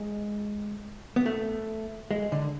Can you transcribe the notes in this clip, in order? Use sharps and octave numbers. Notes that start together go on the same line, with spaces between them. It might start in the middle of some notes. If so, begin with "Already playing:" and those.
Already playing: G#3
B3
A3
G#3
D3